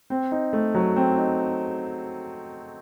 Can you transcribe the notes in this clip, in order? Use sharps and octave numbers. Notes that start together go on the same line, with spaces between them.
C4
D#4
A3
F#3
C4
D#4